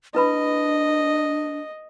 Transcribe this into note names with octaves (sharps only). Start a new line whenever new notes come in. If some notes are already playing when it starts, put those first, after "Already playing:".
D4 E4 B4 D#5 B5